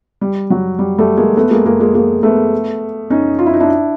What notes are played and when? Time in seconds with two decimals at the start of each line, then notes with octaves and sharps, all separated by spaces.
0.21 G3
0.50 F#3
0.79 G3
0.98 G3 A3
1.17 G#3 A#3
1.37 A3 B3
1.50 G#3 A#3
1.66 G#3 A#3
1.80 G#3 A#3
1.94 G#3 A#3
2.23 A3 B3
3.10 C#4 D#4
3.39 F4
3.46 E4
3.54 D#4
3.60 D4 E4